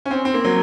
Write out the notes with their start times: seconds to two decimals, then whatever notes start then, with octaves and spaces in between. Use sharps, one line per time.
0.06 C#4
0.11 C4
0.25 C4
0.34 A#3
0.44 F#3